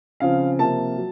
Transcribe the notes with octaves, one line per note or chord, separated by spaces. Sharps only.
C#3 F3 C4 F5
C3 F3 A#3 A5
F#3